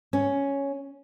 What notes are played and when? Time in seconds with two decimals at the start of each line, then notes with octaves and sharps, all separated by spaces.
0.13 C#4